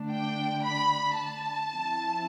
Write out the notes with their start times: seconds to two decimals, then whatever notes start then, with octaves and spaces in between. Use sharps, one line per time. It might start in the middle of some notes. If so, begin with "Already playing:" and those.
Already playing: D3 A3 D4
0.10 G5
0.63 B5
1.17 A5
1.71 F3 C4 E4